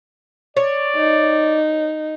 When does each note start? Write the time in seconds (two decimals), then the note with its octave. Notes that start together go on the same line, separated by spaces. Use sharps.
0.57 C#5 D5
0.96 D#4